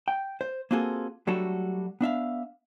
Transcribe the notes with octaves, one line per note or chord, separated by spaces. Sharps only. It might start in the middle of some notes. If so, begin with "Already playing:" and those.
G5
C5
A#3 C4 F4 F#4 G#4 A4
F#3 G3 A3 D4 F#4 A4
B3 D4 E5 F5